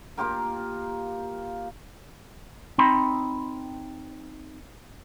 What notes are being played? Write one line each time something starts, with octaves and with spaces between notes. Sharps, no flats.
A#3 F4 G4 A#4
C4 D#4 B5 C6